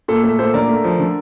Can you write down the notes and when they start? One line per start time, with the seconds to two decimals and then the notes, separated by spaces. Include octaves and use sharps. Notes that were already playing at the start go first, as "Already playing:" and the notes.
0.08 A#2 A4
0.24 A3 A4
0.39 A#2 A4 C5
0.54 D3 A#4 D5
0.69 A3
0.84 F3
1.00 D3